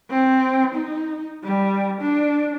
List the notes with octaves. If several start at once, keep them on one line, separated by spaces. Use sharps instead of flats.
C4
D#4
G3
D4